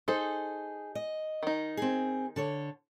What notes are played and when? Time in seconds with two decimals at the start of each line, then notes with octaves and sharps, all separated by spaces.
0.08 D#4 G#4 A4 C5
0.95 D#5
1.43 D#3 D#4
1.77 C4 G#4
2.36 D3 A4 C#5